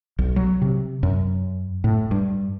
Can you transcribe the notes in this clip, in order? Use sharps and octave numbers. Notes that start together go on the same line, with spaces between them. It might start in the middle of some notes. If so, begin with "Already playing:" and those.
B1
F#3
C3
F#2
A2
G2